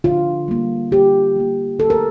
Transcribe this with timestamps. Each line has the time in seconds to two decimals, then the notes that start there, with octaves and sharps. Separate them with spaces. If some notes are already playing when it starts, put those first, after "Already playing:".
0.04 D3 F4
0.48 G3 A#3
0.91 D3 G4
1.36 G3 A#3
1.79 D3 A4
1.90 A#4